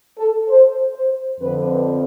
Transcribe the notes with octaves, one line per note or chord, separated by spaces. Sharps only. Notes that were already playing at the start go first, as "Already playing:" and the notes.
A4
C5
C5
F2 D3 F3 C4 B4